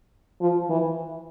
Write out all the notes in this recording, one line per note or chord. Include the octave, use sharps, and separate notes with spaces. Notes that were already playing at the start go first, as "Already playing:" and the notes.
F3
E3